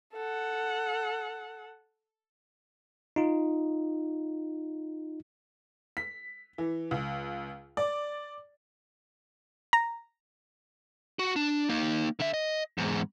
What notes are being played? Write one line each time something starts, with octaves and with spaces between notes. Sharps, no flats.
A4 F#5
D#4 F4
B6
E3
C#2
D5
A#5
F#4
D4
A#3 D#4
D3 E5
D#5
E2 G#2